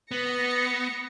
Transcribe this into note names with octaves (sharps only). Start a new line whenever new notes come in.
B3 A#6 C#7